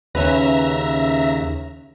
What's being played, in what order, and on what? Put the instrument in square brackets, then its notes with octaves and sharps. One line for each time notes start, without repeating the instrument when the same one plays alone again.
[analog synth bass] D#2 [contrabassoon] C#3 [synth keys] C#4 B4 [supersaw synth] E5 A#5